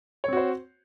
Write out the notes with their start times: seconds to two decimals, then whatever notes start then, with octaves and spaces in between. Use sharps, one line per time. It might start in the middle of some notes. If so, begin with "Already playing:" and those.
0.24 C#5
0.28 C4
0.33 F#4
0.37 C5